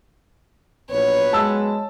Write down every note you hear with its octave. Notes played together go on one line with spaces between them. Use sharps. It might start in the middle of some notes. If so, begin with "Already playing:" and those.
A#1 F#3 B3 B4 C#5
G#3 A5 E6